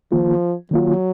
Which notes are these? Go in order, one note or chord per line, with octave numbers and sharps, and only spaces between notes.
D#3 F3 A#3 F4
D#3 F#3 A#3 F4